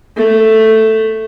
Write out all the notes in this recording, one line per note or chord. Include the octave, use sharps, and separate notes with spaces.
A3